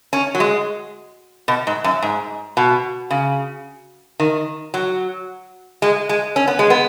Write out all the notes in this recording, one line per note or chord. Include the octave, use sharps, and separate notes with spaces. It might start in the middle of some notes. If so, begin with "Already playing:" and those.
C#4
F#3
G#3
B2
G#2
F#2
G#2
B2
C#3
D#3
F#3
G#3
G#3
C#4
B3
G#3
B3